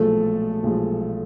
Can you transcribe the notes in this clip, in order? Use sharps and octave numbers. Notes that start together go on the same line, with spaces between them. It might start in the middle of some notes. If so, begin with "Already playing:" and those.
Already playing: B1 A#2 F3 G#3 A3 A4
B1 A#2 F3 G#3